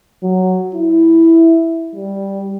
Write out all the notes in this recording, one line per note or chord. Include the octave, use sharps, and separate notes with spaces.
F#3
E4
G3